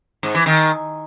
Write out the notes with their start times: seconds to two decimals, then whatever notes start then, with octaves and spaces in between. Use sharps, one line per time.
0.23 G#2
0.35 E3
0.46 D#3